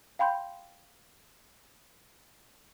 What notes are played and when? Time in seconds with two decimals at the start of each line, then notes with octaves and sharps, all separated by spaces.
0.19 F5 G5 B5 C6 G6